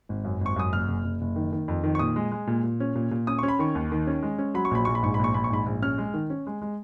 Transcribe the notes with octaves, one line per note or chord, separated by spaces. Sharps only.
G#1
F#2
G#1
C#6
F#2 D#6
F#1 F6
F#1
F#1
F#1
D#3
D#3
F2
D#3
C#6
A#2 D#6
G#3
G#3
A#2
A#2
C#4
A#2
A#2
C#4 D#6
C#4 C#6
B5
D#3 C#6
D#2
D#3
C#4
G#3
C#4
F#3 B5
C#6
A#1 B5
A#1 C#6
B5
G#2 C#6
B5
A#1 C#6
A#1 B5
C#6
G#2 B5
A#1
C#4 F6
G#3
D#3
C#4
G#3
G#3